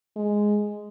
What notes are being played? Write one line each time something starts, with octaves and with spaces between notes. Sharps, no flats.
G#3